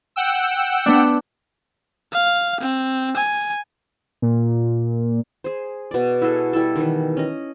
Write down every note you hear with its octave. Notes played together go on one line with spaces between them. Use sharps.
F#5 G5 E6
B3 D4
F5
C4
G#5
A#2
G#4 C5
B2 D5
E4 F#4 G#4 A4
G3 E4 A4
D#3 E3
C#4 D#5